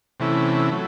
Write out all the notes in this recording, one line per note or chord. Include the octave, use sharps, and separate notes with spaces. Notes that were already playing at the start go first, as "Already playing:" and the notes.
C3 E3 A3 C#4 E4
F#3 A3